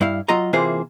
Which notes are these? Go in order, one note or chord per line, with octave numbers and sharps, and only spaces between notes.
G2 E4 F5
F#3 F4 D#5 A#5
C3 E3 A#3 F4 G#4 C5